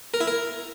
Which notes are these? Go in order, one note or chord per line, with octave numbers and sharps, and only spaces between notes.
A#4
E4
A#4